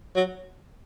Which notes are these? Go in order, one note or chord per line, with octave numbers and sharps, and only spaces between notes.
F#3